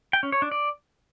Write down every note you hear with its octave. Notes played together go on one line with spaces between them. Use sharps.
G5
C#4
C#5
D4
D5